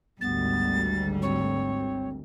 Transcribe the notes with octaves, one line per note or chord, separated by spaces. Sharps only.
G#1 D2 G#2 G3 B3 A6
C4 C#5